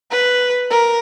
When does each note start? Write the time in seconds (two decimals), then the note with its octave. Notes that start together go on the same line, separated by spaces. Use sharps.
0.11 B4
0.70 A#4